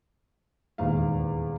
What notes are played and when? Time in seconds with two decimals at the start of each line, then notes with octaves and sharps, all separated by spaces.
0.78 D#1 E2 G#2 F5